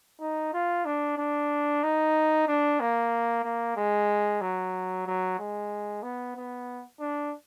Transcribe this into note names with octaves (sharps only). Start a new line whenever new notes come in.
D#4
F4
D4
D4
D#4
D4
A#3
A#3
G#3
F#3
F#3
G#3
B3
B3
D4